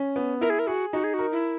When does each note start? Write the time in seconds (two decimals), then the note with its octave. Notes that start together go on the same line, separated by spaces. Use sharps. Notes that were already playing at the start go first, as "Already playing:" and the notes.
Already playing: C#4
0.16 B3
0.41 E4 A#4
0.50 G#4
0.59 A#4
0.67 F#4 G#4
0.93 D#4 F#4
1.04 G#4
1.14 F#4
1.19 A#4
1.32 E4